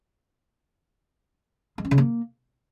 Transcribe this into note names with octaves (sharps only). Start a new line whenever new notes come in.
G#3
C#4
C#3
A#3